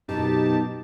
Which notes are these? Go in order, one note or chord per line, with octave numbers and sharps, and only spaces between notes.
F#2 B2 D#4 G4 A5